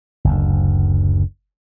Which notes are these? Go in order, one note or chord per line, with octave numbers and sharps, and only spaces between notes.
F#1 D2